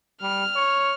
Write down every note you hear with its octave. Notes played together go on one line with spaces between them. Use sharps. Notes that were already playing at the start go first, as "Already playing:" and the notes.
G3 F6
C#5